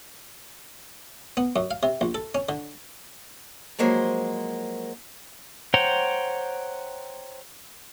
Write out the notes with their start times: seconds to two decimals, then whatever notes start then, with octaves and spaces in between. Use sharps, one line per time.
1.37 B3
1.56 F#2
1.71 F5
1.83 C3
2.01 A#1
2.15 A4
2.35 C#4
2.49 D3
3.79 F3 F#3 G#3 A#3 C5
5.74 C5 C#5 F#5 G5 A#5